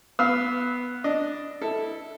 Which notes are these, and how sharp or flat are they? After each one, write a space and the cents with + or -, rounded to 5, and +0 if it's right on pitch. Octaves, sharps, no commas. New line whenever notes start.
B3 +0 F5 +0 E6 -35
D4 +0 D#5 +0
E4 -15 A4 +0